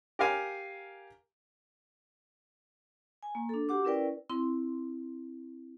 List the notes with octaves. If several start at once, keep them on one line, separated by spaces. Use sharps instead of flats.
G4 A#4 F5 G#5
G#5
A#3
D4 A4
F#4 G4 F#5 D6
C#4 E4 A#4 B4 D5 G5
C4 E4 C6